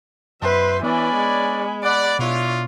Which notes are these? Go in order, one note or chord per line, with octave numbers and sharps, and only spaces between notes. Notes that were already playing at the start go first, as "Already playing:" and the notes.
F#2 B2 B4 C5 E5 C6
E3 B3 C#4 D4 D5 G#5 B5
G#3
D5 F#5 B5
B2 D4 E4 F4 C#5